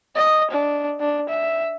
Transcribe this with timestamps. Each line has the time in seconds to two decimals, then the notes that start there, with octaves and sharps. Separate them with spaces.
0.16 D#5
0.51 D4
1.00 D4
1.29 E5